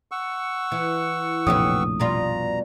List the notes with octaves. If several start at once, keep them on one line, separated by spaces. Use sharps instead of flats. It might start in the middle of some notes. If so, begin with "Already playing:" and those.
F#5 C#6 E6
E3
F1 A#1 A2 E3 F#3 G4 D#6
B2 G3 F4 A#5